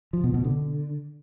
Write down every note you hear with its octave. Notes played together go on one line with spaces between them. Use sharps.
F3
B2
B2
D3